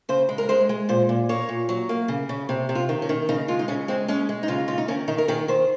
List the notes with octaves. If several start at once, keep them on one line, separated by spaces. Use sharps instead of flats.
C#3 C5
G#3
A#4
G#3 C5
G#3
A#2 C5
A#2
A#3 C#5
A#2
F#3
A#3
C#3
C#3
C3
C3
F4
D#3
C#4
D#3
C#3 D#4
G#3 F4
D#4
C#3 C#4
G#3 C4
G#3 C#4
G#3
D#4
C#3 F4
C#3 F4
D#4
D#3 C#4
D#3 D#4
A#4
D#3 G#4
D#3 C5